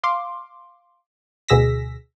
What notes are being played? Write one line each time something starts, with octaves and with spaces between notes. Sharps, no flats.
F5 C6 D6
D2 B2 G#4 E6 A#6 B6